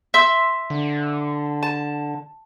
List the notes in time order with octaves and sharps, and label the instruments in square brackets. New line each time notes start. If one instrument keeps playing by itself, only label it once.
[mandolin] E5 C6 E6
[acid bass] D3
[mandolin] A5